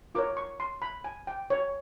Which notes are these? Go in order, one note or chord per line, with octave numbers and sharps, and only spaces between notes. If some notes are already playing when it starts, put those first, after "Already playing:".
F4 A#4 C#5 D6
C#6
C6
B5
G#5
G5
C#5